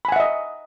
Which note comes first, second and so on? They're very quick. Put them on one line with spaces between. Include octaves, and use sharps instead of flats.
B5 G#5 F#5 E5 D#5